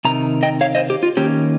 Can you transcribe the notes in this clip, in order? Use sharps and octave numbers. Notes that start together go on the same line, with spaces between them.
C3 D#3 A#5
D#5 G5
C#5 F5
C5 D#5
G4
F4
D#3 A#3 C#4 G4